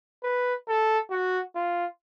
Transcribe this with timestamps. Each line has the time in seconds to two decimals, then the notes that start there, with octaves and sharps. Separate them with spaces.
0.23 B4
0.68 A4
1.11 F#4
1.55 F4